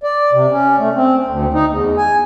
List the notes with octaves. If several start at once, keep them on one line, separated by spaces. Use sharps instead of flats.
D5
C3
C#4
A3
C4
D2
D#4
E2
G#5